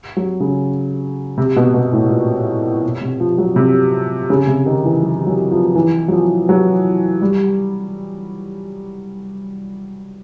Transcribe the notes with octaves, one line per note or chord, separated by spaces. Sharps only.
F#3
C#3
C3
B2
B2
A2
A#2
B2
C3
F3
F#3
C3
C#3
C3
D#3
E3
F#3
F#3
F3
E3
F#3
F3
F#3
G3